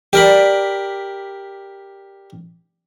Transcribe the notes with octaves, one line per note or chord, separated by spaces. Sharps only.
G4 A#4 D5 B5